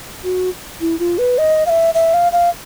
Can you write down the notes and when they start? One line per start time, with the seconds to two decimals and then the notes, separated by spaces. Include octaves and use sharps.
0.24 F#4
0.81 E4
0.99 F4
1.18 B4
1.38 D#5
1.66 F5
1.70 E5
1.94 E5
2.14 F5
2.32 F5